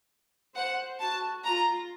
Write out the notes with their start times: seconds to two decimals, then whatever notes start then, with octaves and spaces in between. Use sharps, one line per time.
0.55 C5 F#5
1.00 F#4 A5
1.44 F4 A#5